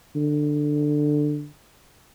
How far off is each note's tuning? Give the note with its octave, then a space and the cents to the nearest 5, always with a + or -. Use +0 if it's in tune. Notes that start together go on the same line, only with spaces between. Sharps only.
D3 +15